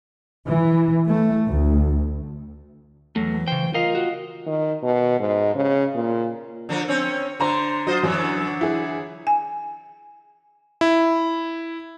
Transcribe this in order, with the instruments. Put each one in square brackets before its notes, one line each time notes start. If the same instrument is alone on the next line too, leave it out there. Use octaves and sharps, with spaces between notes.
[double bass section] E3
A3
D2
[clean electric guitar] E2 F#3 [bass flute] E3 [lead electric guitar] A3
[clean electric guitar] C#3 C5 [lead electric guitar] G5
[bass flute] F4 [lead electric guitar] A#4 [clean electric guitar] D#5 F5
[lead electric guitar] F#4
[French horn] D#3
B2
G#2
C#3
A#2
[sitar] D3 F3 A#4
C4 C#4 C#5
[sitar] D3 [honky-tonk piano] C5 A#5 C6
[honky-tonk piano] F#3 [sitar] F4 C5 D#5
[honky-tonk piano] F#2 [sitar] D3 E3 F#3
[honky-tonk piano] E4 G#4
[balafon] G#5
[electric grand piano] E4